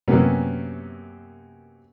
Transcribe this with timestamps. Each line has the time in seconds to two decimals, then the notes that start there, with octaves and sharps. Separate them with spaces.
0.08 F#2 C3 A#3 B3 C#4